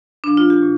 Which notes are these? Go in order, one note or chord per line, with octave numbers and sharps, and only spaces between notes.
A#2 F3 D4
F4
G4
A#2